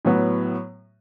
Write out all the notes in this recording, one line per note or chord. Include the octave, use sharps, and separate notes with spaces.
A2 F#3 B3